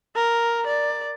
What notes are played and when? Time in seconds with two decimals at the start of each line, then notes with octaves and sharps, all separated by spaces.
0.16 A#4
0.67 D5